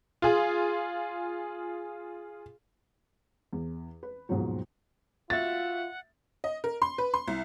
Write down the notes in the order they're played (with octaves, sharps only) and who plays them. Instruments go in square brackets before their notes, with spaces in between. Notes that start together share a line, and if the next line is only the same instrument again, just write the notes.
[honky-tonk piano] F4 G#4
[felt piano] E2
B4
D#2 G#2 B2 F3 F#3
[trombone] F4 [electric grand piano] F#4 E5 [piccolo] F#5 [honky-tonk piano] A6
[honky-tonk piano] D#5
A#4
C6
B4
C6
C2